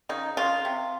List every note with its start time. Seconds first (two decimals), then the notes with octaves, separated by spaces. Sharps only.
0.09 C#3 D#4
0.37 C#3 F4
0.65 C3